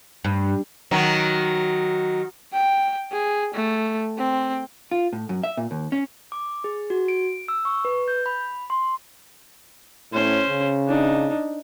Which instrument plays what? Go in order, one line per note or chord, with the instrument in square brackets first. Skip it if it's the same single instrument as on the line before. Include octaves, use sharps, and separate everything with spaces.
[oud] G2
[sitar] D#3 F#3
[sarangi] G5
G#4
A3
C4
[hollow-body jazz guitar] F4
A2
F#2
E5
A#2
D#2
C#4
[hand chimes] D6
G#4
F#4
D7
E6
C#6
B4
G6
B5
C6
[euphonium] A2 [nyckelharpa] C#4 C5
[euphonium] C#3
[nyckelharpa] D4 D#4